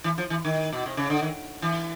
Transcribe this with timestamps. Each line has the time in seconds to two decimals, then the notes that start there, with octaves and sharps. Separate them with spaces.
0.04 E3
0.18 F3
0.30 E3
0.45 D#3
0.73 B2
0.86 C3
0.97 C#3
1.10 D3
1.22 D#3
1.62 E3